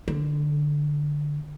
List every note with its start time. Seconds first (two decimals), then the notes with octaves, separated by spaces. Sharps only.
0.08 D3